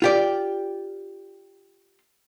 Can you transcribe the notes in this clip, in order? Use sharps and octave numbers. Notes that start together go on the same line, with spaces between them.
F4 G4 D5